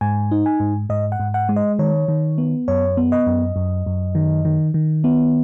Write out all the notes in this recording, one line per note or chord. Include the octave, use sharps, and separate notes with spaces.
G#2 G#5
D#4
G#5
G#2
G#2 D#5
F#5
G#2
F#5
G#3
D#5
D#3 C#5
D#3
B3
F#2 C#5
B3
D#5
F#2
F#2
F#2
D#3
D#3
D#3
B3